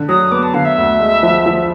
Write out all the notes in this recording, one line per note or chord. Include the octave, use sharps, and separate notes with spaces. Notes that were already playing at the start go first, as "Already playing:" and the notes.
Already playing: D3
F#3 D#6
B3 D6
A5
D3 F5
E5
D2
G#3
F3
F3